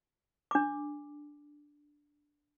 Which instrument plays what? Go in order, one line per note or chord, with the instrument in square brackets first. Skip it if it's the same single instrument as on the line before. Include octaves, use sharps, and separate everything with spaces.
[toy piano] D4 D6